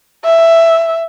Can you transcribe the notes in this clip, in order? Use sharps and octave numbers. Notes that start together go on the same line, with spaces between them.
E5